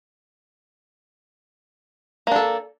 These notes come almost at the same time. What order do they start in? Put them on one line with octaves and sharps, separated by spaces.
A#3 D4 A4